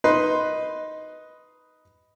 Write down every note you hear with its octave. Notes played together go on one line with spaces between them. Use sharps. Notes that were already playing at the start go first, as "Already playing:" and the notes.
D#4 B4 C6